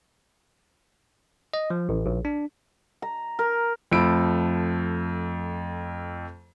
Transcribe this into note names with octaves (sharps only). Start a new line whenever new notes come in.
D#5
F3
A1
A#1
D4
A#5
A#4
F2 F3 A3 B5 E6 D7